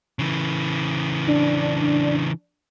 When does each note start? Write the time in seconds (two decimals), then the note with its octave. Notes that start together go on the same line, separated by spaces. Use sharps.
0.19 C#3 E3
1.27 D4